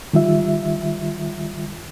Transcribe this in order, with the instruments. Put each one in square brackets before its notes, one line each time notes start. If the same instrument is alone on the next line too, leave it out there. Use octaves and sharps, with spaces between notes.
[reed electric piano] D#3 G3 F4 E5